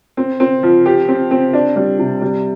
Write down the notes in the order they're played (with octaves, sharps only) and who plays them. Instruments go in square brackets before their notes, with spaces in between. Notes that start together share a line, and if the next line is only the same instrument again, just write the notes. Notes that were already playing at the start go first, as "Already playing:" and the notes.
[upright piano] C4
C4
F3
G4
C4
C4
D4
G3
C3
G3